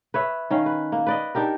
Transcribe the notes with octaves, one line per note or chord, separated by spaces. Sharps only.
B4 C#5 E5
D#3 C#4 F5
B4
A#3
B4 D5 D#5
D4 D#4 G4 A#4